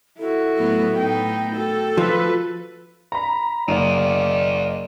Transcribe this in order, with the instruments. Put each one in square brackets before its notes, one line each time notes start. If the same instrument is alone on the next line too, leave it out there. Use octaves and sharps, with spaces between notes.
[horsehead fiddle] E4 F#4 [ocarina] A4
[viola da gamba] A2 F#3 B3
[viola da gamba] A2 B3 D#4 [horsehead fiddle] G5
[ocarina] F#4 [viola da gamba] A4
[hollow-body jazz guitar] F3 [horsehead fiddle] B4
[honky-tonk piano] A#5 B5
[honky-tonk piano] F#1 [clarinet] D5 [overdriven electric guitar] D#5 F5